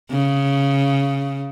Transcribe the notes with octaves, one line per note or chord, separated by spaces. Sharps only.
C#3